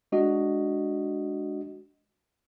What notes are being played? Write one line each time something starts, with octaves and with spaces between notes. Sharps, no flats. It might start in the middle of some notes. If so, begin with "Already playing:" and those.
G#3 D4 F#4 D#5